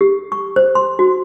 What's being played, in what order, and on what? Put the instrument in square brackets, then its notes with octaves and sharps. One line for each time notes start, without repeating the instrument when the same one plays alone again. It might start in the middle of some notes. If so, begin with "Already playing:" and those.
[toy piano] G4
C#6
C5
C6
F#4